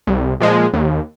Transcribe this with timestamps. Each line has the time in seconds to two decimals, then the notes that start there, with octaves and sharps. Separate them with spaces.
0.07 C2
0.40 A#2 F3 G#3
0.73 D#2